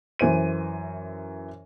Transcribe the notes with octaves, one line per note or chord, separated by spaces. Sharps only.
F#2 E3 C5 D#7